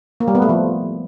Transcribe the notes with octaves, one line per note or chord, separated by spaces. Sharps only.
A#3
G3
B3
A3
F3